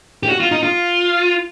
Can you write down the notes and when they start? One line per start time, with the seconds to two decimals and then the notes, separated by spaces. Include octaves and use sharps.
0.23 G4
0.29 F#4
0.40 F4
0.51 D#4
0.63 F4